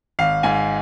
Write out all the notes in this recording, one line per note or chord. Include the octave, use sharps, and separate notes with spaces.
G#1 F5
G#2 G#5